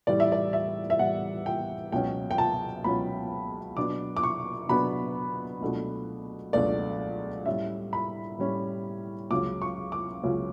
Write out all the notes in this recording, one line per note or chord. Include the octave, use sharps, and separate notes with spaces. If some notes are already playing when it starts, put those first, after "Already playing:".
A2 E3 G3 D5
E5
D5
E5
E5
A2 E3 G3 F#5
G5
C#2 B2 F#3 C#4 G5
G5
A5
C#2 B2 F#3 C#4 B5
B2 F#3 B3 D4 D6
D6
C#6
B2 F#3 B3 D4 B5
C#2 B2 F#3 A3 D4
C#2 B2 F#3 A3 D4 D5
A2 G3 C#4 E5
B5
A2 G3 C#4
C#2 C#3 F#3 C#4 D6
C#6
D6
C#2 C#3 F#3 C#4